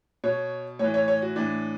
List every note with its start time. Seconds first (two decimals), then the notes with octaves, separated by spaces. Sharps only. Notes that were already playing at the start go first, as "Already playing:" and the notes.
0.24 B2 C#5
0.79 A2 E3 C#5
0.94 C#5
1.08 C#5
1.22 F#4
1.36 A2 E3 D4